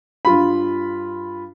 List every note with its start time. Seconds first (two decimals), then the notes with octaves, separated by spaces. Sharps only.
0.25 G2 F4 B5